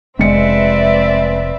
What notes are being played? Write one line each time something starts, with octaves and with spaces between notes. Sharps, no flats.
F1 G#3 C4 B4 D5 E5 C#7